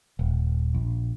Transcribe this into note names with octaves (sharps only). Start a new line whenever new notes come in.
D#1
A#1